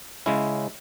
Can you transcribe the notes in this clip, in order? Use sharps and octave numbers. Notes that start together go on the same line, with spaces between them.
C#3 G#3 C#4 E4